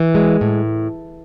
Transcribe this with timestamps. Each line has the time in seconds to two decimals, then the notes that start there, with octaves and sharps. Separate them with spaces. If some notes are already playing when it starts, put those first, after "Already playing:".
Already playing: E3
0.15 G#3
0.41 A2